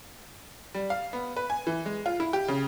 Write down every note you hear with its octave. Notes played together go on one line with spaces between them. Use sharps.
G3
F5
B3
B4
G#5
E3
G#3
F4
E4
G4
C#3